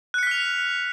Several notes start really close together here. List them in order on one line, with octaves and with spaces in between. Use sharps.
F#6 C#7 B6 F6 F7